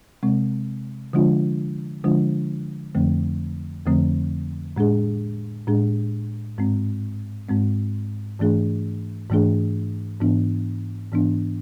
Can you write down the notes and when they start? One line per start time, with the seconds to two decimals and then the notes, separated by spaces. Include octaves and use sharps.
0.23 C3 G#3 C4
1.13 D3 F3 G#3 D4 F4
2.04 D3 F3 G#3 D4 F4
2.95 F2 D3 F3 A3 C4
3.86 F2 D3 F3 A3 C4
4.77 A2 G#3 D4 G#4
5.67 A2 G#3 D4 G#4
6.58 G#2 G#3 C4
7.49 G#2 G#3 C4
8.40 G#2 E3 A3 D4 G#4
9.30 G#2 E3 A3 D4 G#4
10.20 G#2 E3 B3 D4
11.12 G#2 E3 B3 D4